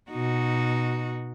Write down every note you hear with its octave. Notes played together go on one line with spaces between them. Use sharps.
B2 D#4 F#4